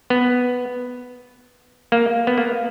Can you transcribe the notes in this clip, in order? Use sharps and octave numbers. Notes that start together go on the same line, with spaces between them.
B3
A#3
B3
A#3